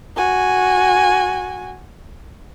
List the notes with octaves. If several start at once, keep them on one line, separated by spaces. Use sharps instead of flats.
F#4 G#5